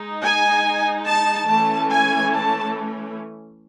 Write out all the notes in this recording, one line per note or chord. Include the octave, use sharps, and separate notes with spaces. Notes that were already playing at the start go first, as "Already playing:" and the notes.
Already playing: G#3 D#4
G#5
A5
E3 A3 C#4 A5
G#5
A5